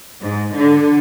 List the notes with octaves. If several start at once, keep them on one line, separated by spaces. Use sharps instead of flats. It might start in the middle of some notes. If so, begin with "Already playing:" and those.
G#2
D3